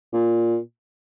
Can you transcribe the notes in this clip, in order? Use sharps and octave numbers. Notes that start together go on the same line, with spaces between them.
A#2